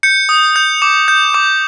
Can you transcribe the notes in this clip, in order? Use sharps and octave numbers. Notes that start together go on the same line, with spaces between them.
G6 C#7
D#6
G6
D6
G6
D6